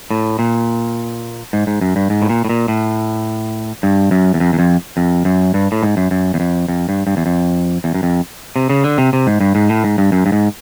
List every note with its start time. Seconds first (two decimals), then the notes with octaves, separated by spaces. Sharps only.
0.11 A2
0.39 A#2
1.53 G#2
1.67 G#2
1.81 F#2
1.96 G2
2.10 G#2
2.22 A2
2.29 A#2
2.45 A2
2.49 A#2
2.68 A2
3.83 G2
4.11 F#2
4.34 E2
4.40 F2
4.53 E2
4.59 F2
4.97 F2
5.25 F#2
5.54 G2
5.72 A2
5.83 G#2
5.97 F#2
6.11 F#2
6.34 E2
6.40 F2
6.68 F2
6.89 G2
7.07 G2
7.17 E2
7.26 F2
7.84 E2
7.94 F#2
8.03 F2
8.56 C3
8.70 C#3
8.84 D3
8.98 C3
9.13 C3
9.27 G#2
9.41 G2
9.55 G#2
9.69 A2
9.84 G#2
9.98 G2
10.12 F#2
10.26 G2
10.32 G#2